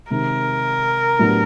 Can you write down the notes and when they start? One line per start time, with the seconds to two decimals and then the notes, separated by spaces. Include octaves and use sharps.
0.10 C3 D#3 G#3 A#4
1.19 A2 F#3 B3 D4 G4